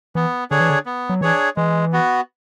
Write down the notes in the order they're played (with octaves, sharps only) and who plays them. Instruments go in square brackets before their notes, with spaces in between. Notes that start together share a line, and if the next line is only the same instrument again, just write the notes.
[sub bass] E3 [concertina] B3
[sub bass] D3 [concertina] D4 G#4 C#5
[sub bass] E3
D3
[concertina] B3
[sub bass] F#3
[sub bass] E3 [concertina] D4 G#4 C#5
[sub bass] E3 [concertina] G#3
[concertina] B3 F#4